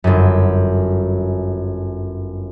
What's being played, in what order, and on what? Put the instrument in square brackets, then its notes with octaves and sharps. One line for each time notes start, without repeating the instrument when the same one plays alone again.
[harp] G1 F#2